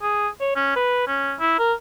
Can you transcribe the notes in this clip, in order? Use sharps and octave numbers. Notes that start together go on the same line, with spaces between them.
G#4
C#5
C#4
B4
C#4
E4
A#4